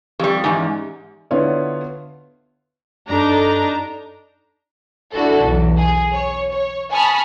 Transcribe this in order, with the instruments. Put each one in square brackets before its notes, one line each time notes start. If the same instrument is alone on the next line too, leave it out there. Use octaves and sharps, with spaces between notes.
[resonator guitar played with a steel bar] F2 G3 [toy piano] G4
[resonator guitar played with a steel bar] E2 G#2 [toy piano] C#4
[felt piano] D3 B3 E4 F4 C#5 D5
[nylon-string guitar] G2 A4 [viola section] D4 D#4 [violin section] A#5
[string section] D4 E4 F#4 A4
B1 E2
G#4
C#5
C#5
G#5 A5 B5 C#6 D#6 F6